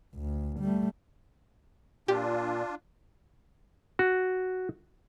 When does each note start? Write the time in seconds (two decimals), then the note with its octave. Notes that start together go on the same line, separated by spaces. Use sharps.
0.15 D2
0.60 G3 A3
2.08 A#2 D4 F4 G4
3.99 F#4